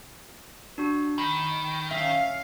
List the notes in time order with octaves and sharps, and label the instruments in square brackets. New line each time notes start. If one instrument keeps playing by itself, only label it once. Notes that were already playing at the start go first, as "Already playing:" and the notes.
[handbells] D4 F#4
[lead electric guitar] D#3 [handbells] B5
[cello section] C#4 F5 [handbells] E5